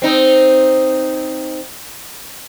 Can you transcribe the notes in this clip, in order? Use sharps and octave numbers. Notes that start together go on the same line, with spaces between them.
C4 D#4